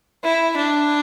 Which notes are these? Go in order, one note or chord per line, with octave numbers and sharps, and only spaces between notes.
E4
D4